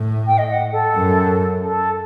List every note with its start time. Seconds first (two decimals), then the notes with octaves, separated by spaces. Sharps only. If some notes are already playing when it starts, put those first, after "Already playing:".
Already playing: A2
0.26 G5
0.37 D#5
0.49 F#5
0.72 A4
0.95 F#2
1.64 A4